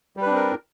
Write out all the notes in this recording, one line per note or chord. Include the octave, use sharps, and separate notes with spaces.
G3 C4 D4 A#4 B4